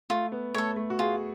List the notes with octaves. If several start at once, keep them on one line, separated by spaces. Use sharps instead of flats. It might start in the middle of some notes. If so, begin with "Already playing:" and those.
A3 F4
B3
A3 A4 C#5
A3
F#4
F4 G#4